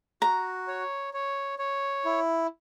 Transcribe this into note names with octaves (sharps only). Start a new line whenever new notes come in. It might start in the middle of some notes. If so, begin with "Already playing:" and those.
F#4 A#5
C#5
C#5
C#5
E4